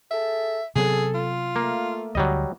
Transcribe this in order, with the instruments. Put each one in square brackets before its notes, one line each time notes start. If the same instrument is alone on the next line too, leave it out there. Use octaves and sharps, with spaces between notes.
[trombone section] G#4 A4 [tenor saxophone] E5
[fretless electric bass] C3 F#3 B3 [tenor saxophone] G#4 [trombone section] A4
[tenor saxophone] F4
[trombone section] A3 [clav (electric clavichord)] A#3
[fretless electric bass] D2 D3 [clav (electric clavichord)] F#3 G3 D#5